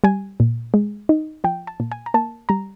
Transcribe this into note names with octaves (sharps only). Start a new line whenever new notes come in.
G3 G#5
A#2
G#3
D#4
F3 G5
A5
A#2
G#5
A#5
A#3 A5
G3 A#5